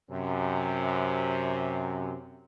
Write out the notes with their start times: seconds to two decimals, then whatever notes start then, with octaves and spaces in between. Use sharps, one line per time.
0.10 F#2 C3